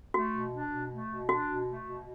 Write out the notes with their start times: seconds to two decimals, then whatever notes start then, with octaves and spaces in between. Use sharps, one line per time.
0.14 A3 F#4
0.33 B2
0.53 D4
0.71 B2
0.91 A3
1.10 B2
1.29 D4 F#4
1.49 B2
1.69 A3
1.87 B2